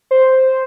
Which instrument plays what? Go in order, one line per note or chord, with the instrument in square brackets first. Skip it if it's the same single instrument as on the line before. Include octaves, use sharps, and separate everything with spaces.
[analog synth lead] C5